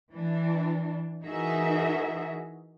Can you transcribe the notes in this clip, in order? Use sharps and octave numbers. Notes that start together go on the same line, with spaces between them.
E3 D4
E3 D#4 F#4 G#4 A#4 E5